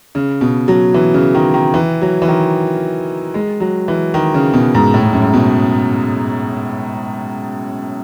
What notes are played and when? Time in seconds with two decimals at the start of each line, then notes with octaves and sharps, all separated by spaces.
0.15 C#3
0.41 B2
0.68 F#3
0.94 E3
1.14 C#3
1.35 D#3
1.54 D#3
1.74 E3
2.02 F#3
2.22 E3
2.28 D#3
3.34 G#3
3.60 F#3
3.88 E3
4.14 D#3
4.34 C#3
4.53 B2
4.75 G#2
4.94 A2
5.03 G#2
5.13 F#2
5.22 G#2
5.34 B2